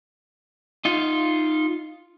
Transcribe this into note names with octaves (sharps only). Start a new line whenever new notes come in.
D#4 F4